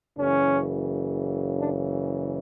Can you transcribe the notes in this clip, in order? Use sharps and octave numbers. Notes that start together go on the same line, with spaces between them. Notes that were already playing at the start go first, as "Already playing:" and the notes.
F#1 F#2 C#3 E3 C#4
D4